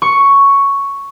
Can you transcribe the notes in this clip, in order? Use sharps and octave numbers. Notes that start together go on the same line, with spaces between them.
C#6